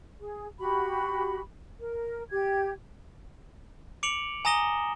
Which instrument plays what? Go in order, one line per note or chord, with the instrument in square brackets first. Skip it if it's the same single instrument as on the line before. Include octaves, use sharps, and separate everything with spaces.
[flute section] G#4
F#4 G4 B5
A#4
G4 G#6
[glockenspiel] D6 C#7 D7 F7 F#7
G#5 A#5 D#6 A#6 E7 G7